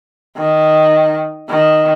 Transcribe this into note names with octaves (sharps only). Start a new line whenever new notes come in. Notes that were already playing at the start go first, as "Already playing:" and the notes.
D#3
D#3